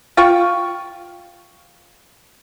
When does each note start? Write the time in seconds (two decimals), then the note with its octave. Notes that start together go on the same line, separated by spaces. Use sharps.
0.17 F4 G5 C#6